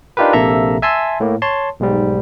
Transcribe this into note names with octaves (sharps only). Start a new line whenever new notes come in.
D4 D#4 F4 G4 A#4 B4
A#1 C3 A#3 A4 E5 A#5
E5 G#5 A5 C6 E6
A2 A#3
C#5 A5 C6
B1 G#2 G3